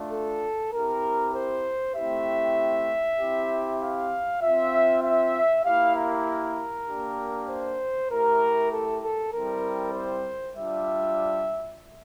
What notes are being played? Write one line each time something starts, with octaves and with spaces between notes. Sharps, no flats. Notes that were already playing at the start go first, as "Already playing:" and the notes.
Already playing: A3 D4 F4
A4
C4 E4 G4 A#4
C5
A3 C4 E4 G4 E5
C4 E4 G4
F5
C4 F4 E5
E5
A#3 E4 G4 F5
A#4
A#3 D4 G4
C5
A3 E4 G4 A#4
A4
A4
G3 C4 E4 A#4
C5
G3 D4 F4 E5